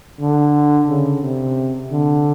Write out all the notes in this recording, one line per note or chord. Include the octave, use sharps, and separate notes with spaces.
D3
C#3
C3
D3